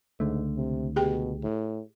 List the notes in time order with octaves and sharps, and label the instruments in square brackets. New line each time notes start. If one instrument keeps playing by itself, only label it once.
[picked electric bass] C#2 D3 A3 [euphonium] G#2
[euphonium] C3
[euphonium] B2 [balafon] G4 G#4 G5
[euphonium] A2